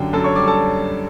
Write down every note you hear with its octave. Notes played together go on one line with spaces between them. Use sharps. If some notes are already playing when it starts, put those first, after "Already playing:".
Already playing: F#2 D3 G4 G5
F#2 A4 A5
C#5 C#6
G3 D5 D6
A4 A5